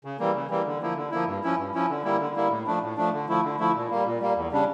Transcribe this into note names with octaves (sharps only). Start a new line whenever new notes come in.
C#3
E3 G3 A#3
C#3
E3 G3 A#3
D3
F3 A#3 E4
D3
F3 A#3 E4
G2
F3 C#4 E4
G2
F3 C#4 E4
D3
G3 A#3 E4
D3
G3 A#3 E4
A2
F3 A3 D4
A2
F3 A3 D4
D3
F3 A3 E4
D3
F3 A3 E4
A#2
G3 A#3
A#2
G3 A#3
E2
C#3 G3 D4